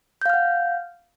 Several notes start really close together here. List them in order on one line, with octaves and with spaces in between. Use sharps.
G6 F5 F6 F#5